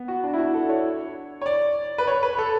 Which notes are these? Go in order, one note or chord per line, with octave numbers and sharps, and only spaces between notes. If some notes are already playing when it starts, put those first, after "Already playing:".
Already playing: B3
F#4
D4
E4
F#4
A4
C#5
C#5
D5
B4
C#5
B4
A4